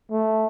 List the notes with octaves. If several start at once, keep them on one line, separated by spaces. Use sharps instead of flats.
A3